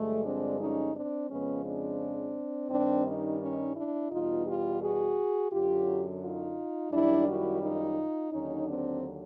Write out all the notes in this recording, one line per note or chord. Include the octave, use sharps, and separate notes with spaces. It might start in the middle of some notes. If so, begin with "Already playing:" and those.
Already playing: G2 D3 F3 G#3 A3
C4 D4
C#4 D#4
C4 D4
F2 C#3 F3 G#3 B3 C#4
C4 D4
G2 D#3 G3 C4 D4
C#4 D#4
C#4 D#4
D4 E4
E2 B2 G3 D#4 F4
F4 G4
F#4 G#4
F#2 D3 F#3 F4 G4
D#4 F4
F#2 D#3 G3 D4 E4
E4 F#4
D#4 F4
D#2 D3 F#3 C#4 D#4
C4 D4